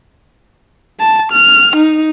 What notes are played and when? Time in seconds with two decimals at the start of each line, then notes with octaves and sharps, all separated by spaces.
1.00 A5
1.32 F6
1.76 D#4